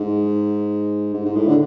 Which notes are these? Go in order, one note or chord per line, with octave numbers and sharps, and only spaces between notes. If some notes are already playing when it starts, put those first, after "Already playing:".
Already playing: G#2
G#2
G#2
A2
D3